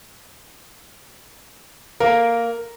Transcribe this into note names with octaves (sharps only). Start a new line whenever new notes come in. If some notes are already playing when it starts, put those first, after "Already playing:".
A#3 A#4